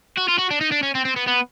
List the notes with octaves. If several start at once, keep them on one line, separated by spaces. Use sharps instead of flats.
F#4
F4
F#4
D4
D#4
D4
C#4
C4
C4
B3
B3